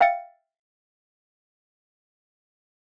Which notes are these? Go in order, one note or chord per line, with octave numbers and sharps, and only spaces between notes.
E5 F5 G5 A6 C#7